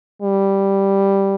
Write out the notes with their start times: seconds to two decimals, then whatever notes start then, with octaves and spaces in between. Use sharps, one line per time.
0.22 G3